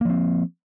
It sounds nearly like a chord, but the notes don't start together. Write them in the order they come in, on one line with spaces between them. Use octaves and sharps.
A#3 F3 C4